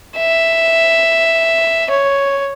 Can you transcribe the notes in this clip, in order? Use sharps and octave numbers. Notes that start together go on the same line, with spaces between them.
E5
C#5